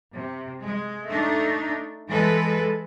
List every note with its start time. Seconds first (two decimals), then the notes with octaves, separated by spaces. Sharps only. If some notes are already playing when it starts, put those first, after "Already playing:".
0.12 C3
0.62 G#3
1.08 A3 D4 D#4
2.08 E3 G#3 A4 B4